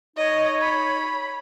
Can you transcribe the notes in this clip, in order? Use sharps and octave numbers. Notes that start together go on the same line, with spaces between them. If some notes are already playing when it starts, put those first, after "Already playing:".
D#4 C#5 D#5
B5